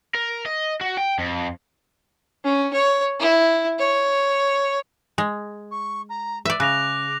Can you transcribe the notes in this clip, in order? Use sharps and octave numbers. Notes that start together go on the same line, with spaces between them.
A#4
D#5
F#4
G5
F2
C#4
C#5
E4
C#5
G#3
C#6
A#5
B4 D5 E5
C#3 D6 F#6 A#6 F7